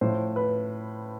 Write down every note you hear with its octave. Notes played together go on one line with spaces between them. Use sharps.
A2 F3 C5
B4